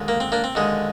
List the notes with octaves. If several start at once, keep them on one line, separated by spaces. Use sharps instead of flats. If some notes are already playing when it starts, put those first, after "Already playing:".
Already playing: D#2 D3 G#3
A#3
C4
A#3 D4
C4
D#2 D3 G#3